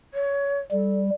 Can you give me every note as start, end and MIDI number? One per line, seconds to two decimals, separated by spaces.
0.14 0.59 73
0.72 1.10 55
0.72 0.99 69